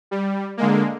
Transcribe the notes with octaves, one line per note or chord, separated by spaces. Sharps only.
G3
D3 G#3 A#3